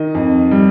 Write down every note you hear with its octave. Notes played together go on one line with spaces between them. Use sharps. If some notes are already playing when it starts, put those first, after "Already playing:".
Already playing: D#3 D#5
F2
G3